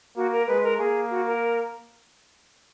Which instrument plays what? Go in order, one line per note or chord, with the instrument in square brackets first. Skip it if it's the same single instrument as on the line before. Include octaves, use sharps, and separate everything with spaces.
[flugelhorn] A#3 [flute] F#4
[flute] A#4
[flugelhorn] G#3 [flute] B4
[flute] A#4
[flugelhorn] A#3 [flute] G#4
[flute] F#4
A#4